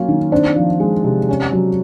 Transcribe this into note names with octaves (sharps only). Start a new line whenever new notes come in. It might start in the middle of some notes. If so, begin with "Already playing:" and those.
Already playing: F#3 A#3 C#4 F4
D#3
C4 D4
F3
G#3
C3
C#4
F#3